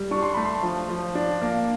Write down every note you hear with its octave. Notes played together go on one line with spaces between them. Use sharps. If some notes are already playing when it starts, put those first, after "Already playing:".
Already playing: G3
D4 C#6
C6
A3 B5
C6
F3
F3
D4
A#3